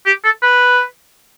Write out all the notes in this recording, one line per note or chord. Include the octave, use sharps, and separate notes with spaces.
G4
A4
B4